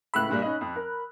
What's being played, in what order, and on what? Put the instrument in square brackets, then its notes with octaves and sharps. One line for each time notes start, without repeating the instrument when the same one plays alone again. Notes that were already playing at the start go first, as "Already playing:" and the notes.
[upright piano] C#2 A2 E6 [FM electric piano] B5 F#6
[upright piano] G2 A#2 G3
C#4 D#4 D#5
F2
A#4